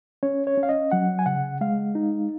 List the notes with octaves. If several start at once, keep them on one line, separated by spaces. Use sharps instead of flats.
C#4 C#5
C#5
C#4
F5
D#5
F#3 F#5
G#5
C#3 F#5
G#3 F5
D#4